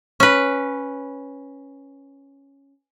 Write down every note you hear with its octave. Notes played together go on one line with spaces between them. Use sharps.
C#4 B4